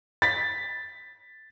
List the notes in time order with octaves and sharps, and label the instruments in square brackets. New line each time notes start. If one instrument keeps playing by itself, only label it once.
[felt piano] A6 B6